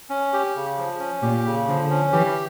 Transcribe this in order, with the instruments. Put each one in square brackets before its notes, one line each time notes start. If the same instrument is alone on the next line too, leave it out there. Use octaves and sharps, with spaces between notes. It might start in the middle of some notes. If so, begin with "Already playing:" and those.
[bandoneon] C#4
G4
C#3
F3
C#4
[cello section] A#2 [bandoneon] G4
[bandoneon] C#3
[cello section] D3 [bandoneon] F3
[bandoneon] C#4
[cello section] E3 [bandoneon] G4